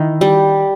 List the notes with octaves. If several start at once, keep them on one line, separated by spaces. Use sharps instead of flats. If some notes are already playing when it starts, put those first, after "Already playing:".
Already playing: D#3 E4
G3